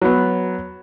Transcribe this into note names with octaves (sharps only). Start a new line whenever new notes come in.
F#3 B3